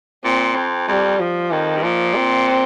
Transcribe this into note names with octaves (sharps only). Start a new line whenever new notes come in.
A#2 C4
F2
F2 G3
F3
F2 D#3
G2
A#2 F3
C4